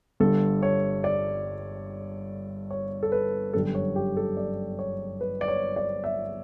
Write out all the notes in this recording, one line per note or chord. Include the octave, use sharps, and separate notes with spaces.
G1 G2 D3 A4
C#5
D5
C#5
A4
B4
G1 F#2 D3 G3 A4
C#5
G4
A4
D5
C#5
B4
D5
C#5
D5
E5